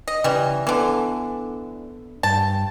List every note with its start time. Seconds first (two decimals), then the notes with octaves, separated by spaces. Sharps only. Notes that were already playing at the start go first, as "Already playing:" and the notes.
0.08 D#5
0.24 C#3 E3 G3
0.67 D3 E3 B3 D4 A4
2.23 G2 G5 A5